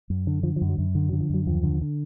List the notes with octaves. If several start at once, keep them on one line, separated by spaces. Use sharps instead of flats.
F#2
D3
D3 F3
F3
F#2
F#3
F#2
D3
F#3
D3
F3
F#2 F#3
D#2 F3
D3
D3